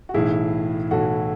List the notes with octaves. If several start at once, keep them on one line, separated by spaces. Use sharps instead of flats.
F#4
B1 A2 E3 E4 G#4
B1 A2 E3 F#4 A4